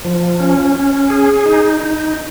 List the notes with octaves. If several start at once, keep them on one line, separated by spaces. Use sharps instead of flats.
F3
C#4
C#4
G#4
D#4
D#4